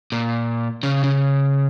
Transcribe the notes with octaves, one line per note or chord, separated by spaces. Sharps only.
A#2
C#3
C#3